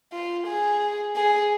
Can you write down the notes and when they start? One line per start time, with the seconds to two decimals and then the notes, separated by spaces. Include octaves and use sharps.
0.12 F4
0.47 G#4
1.16 G#4